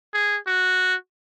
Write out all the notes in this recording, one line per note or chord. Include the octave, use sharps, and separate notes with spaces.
G#4
F#4